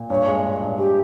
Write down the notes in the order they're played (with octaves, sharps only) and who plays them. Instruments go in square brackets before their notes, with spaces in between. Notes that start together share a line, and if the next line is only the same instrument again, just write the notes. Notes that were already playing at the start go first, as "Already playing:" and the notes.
Already playing: [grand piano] A#2
[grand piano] G2 [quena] C#5
[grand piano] G#3
G2
G2
[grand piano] G2 [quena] G4